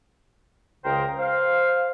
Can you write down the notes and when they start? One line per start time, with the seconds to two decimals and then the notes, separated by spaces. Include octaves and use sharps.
0.84 C#2 C#3 A#4 C5 G5
1.18 C5 F5